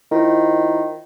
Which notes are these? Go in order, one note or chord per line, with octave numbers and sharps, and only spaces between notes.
D#3 E4 F4 C5